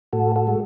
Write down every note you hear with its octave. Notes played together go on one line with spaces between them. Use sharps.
A2 F#4 A4
F#4 A4
G#3